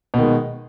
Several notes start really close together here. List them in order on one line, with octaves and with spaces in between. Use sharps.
B2 D#3 G#3